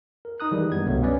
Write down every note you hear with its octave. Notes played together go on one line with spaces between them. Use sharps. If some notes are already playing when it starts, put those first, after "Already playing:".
A#4
D#4 A#5 D#6 F#6
D#3 E3 G3 G#3
G2 B3 G#6
C2 G2 B2 F#3 A3 B3
C#4 B4 D5 D#5